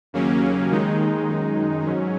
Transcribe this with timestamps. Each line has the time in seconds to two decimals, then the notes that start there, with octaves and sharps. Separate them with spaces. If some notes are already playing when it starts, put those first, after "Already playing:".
0.13 D#2 C#3 F#3 A#3 C#4
0.71 D#2 D#3 G#3 D#4
1.28 F#2 D#3 G#3 D#4
1.86 G#2 F#3 C#4